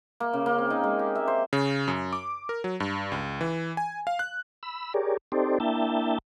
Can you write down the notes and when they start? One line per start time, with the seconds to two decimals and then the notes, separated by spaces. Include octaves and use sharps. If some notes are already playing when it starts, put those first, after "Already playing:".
0.20 A#3
0.33 C#3
0.46 A#3
0.58 C4
0.70 D#4
0.84 G#3
0.99 G4
1.15 E5
1.28 C5
1.53 C#3
1.88 F#2
2.13 D6
2.49 A#4
2.64 F#3
2.80 G2
3.12 C#2
3.41 E3
3.77 G#5
4.07 F5
4.19 F#6
4.63 B5 E6
4.94 G4 G#4 A#4 C#5 D5
5.32 C4 D#4 G4 A4 C5 D5
5.60 A#3 D4 E4 E5 G5 A5